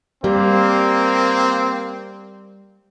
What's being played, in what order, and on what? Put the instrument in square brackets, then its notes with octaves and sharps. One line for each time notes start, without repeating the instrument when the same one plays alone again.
[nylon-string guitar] G3 [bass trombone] A#3 [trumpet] C4